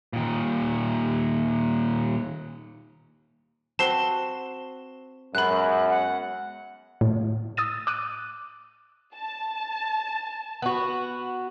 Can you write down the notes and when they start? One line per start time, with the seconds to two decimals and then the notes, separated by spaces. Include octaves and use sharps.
0.13 A#2 D#3
3.79 C4 F#4 B4 A5 C7 G7
5.35 F#2 G#3 B3 B5 F#6
5.91 F#5
7.01 A2
7.57 D#6 E6 A6 D#7
7.87 D6 E6 F#6 D#7
9.14 A5
10.62 B3 F#4